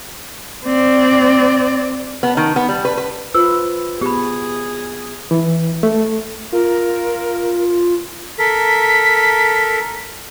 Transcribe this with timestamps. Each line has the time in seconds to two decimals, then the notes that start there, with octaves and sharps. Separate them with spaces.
0.65 C4 D5
2.23 B3
2.37 D#3
2.56 B3
2.69 G3
2.85 B4
2.97 B4
3.34 F4 B4 C5 E6
4.01 B3 G4 G#4 B5
5.31 E3
5.83 A3
6.53 F4 A#4
8.39 A4 A#4 B6